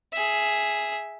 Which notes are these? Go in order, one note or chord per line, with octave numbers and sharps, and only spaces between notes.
G#4 E5